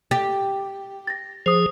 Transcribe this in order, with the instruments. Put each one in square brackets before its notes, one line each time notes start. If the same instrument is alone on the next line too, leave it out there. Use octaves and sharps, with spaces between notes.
[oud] G4 [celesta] A6
[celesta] A6 A#6
[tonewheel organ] F3 G#4 [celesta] C5 D#6